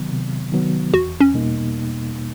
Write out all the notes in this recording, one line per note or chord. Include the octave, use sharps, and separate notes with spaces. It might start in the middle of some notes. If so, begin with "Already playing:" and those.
Already playing: C3 D#3 F#3 B3
C3
D#3 F#3 B3
E2 F#4
C#4
B2 G3 A#3 D#4